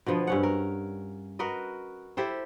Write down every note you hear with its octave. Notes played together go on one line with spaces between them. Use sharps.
B2 D3 F3 B3
G2 C#4 F#5
A#4
F#4 A#4 B4 D#5
E4 G4 A4 C5